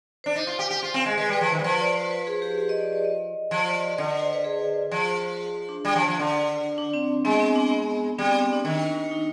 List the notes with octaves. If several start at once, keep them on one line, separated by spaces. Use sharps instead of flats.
D4 C5
D#4
F4
G4
G4
F4
C4
G#3
G#3 B4
G3 B4
F3
D#3 C5
G3
F3 B4
D5
C5
B4
G#4
G4
G4
D#5
D5
D5
D#5
F3
D5
D5
D3 D#5
D5
C5
B4
G#4
F3
D4
G3
F3
F3
D3
D4
C4
G#3 B3
C4
D4
B3
G3 C4
B3
C4
D4
D#3
D#4